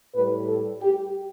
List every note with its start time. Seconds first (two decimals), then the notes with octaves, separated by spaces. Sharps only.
0.14 A2 G3 B4
0.48 A4
0.82 G4